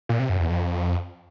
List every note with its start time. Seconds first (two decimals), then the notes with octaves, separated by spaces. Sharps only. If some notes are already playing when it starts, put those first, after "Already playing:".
0.09 A#2
0.19 C3
0.29 F#2
0.40 E2
0.50 F2